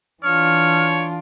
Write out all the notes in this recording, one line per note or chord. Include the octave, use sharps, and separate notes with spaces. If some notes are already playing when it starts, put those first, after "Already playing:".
E3 D4 F4 C#5 F6